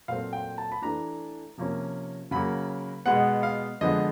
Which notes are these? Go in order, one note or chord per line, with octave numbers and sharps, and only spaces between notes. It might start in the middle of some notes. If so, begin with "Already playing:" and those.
A#2 F#3 A3 C4 F5
G5
A5
B5
E3 A3 D4 A#5
C3 F3 A#3 C#4
C#3 F#3 A#3 B5
B2 G#3 B3 F#5
F5
D3 F3 G#3 B3 D#5